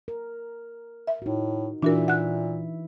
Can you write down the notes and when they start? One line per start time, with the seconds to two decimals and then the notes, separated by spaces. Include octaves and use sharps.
0.08 A#4
1.07 E5
1.22 A2 D#4 F#4
1.83 A#2 E3 D4 E4 F#4 A#4 E5
2.08 F#5 F#6